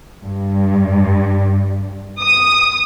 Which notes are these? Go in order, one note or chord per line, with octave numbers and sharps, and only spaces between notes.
G2
D#6